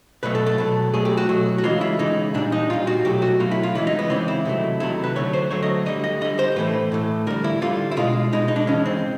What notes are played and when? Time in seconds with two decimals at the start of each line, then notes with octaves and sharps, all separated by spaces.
0.23 B2 F#3 A3 B4
0.35 A4
0.46 A4
0.58 B2 F#3 A3
0.94 B2 F#3 A3 G#4
1.05 G4
1.17 F#4
1.29 B2 F#3 A3
1.58 F#4
1.64 C#3 E3 G#3 F4
1.81 E4
1.99 C#3 E3 G#3 D#4
2.34 A#2 G3 D4
2.52 D#4
2.70 A#2 G3 F4
2.87 F#4
3.05 B2 F#3 A3 G4
3.22 F#4
3.39 B2 F#3 A3 F4
3.51 E4
3.63 F4
3.75 C#3 E3 G#3 E4
3.87 D#4
3.99 B3
4.10 C#3 E3 G#3 C4
4.28 E4
4.45 C3 D#3 F#3 A3
4.80 C3 D#3 F#3 A3 E4
5.04 B4
5.16 D3 F#3 A3 C#5
5.33 C5
5.51 D3 F#3 A3 C#5
5.62 D#5
5.86 D3 G3 D#5
6.04 D#5
6.21 D3 G3 D#5
6.39 C5
6.56 A2 E3 A3 B4
6.92 A2 E3 A3
7.27 D3 G3 A#4
7.44 E4
7.62 D3 G3 F4
7.91 E4
7.97 B2 G#3 F4
8.33 B2 G#3 D#4
8.48 D#4
8.56 D4
8.67 C#3 E3 G#3 C#4
8.86 C4